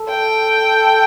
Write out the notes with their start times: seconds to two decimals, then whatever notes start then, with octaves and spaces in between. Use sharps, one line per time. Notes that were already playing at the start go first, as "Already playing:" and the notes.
Already playing: A4
0.09 G5